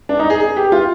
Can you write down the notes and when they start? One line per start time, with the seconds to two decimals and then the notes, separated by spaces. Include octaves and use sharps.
0.09 D4
0.19 D#4
0.30 G#4
0.41 G#4
0.56 G4
0.72 F4